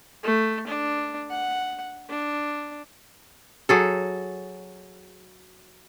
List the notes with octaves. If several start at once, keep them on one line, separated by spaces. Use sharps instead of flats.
A3
D4
F#5
D4
F#3 G#4 A4